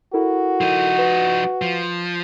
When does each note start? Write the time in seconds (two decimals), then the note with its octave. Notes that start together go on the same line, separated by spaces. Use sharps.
0.13 E4 F#4 A4 A#4
0.61 F3 D#4
0.98 B4
1.62 F3